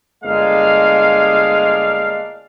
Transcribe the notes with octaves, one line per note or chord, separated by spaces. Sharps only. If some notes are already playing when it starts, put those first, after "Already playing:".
G1 G#3 A#3 D4 F5